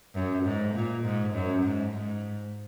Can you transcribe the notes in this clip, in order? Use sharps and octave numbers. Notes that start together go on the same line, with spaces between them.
F#2
G#2
A#2
G#2
F#2
G#2
G#2